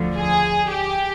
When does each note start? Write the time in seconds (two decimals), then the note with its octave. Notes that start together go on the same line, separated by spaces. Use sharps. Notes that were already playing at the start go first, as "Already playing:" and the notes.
Already playing: D2 D3 F3
0.15 G#4
0.71 G4